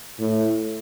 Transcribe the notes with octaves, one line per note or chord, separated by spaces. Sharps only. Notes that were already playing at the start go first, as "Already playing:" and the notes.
A2